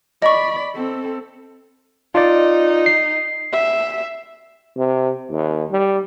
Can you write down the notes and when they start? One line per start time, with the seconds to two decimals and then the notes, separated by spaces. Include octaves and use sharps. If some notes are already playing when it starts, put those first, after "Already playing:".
0.22 D5 D#5 B5 C#6
0.75 C4 A4
2.15 D#4 F4 D5
2.86 C7
3.53 E5
4.76 C3
5.30 D#2
5.70 G3